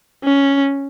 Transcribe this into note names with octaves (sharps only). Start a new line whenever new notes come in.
C#4